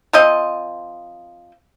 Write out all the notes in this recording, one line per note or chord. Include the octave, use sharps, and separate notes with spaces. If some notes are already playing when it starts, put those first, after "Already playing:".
F3 C4 D#5